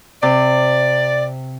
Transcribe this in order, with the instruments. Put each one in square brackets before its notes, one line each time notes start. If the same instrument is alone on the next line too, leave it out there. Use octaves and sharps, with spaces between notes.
[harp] C3 [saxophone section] D5